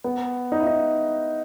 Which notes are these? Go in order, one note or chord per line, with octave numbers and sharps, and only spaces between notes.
B3
D#4
E4
D#4